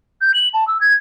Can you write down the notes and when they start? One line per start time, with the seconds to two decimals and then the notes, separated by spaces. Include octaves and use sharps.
0.21 G6
0.34 F#7
0.54 A5
0.68 E6
0.81 G#6